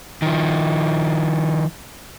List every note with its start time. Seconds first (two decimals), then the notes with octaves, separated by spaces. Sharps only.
0.22 D#3 F3